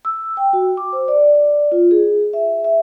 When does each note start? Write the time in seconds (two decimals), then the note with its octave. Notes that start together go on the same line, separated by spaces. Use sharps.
0.05 E6
0.37 G5
0.53 F#4
0.77 D6
0.93 C5
1.08 D5
1.35 D5
1.72 F4
1.91 G#4
2.33 E5
2.64 E5